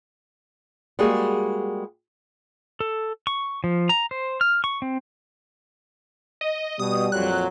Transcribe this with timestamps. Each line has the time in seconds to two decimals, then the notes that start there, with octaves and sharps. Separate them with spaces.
0.99 G3 G#3 A#3 F#4 G#4
2.80 A4
3.27 C#6
3.64 F3
3.89 A#5
4.11 C5
4.41 F6
4.64 C#6
4.82 C4
6.41 D#5
6.79 B2 G3 D#6
7.12 F2 A#2 F#3 F#6